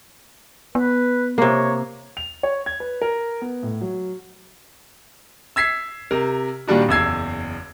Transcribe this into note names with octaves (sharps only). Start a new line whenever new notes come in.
B3 B4
C3 A#3 C#5
F7
C#5
G#6
B4
A#4
B3
A2
F#3
E6 G#6 B6 C7
C3 A#4
A#2 D#3 G3 D4 F#4
F#1 E2 E6 G#6 C7